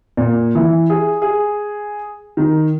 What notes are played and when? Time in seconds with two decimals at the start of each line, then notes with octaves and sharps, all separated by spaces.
0.17 A#2
0.55 E3
0.90 G#4
1.22 G#4
2.37 D#3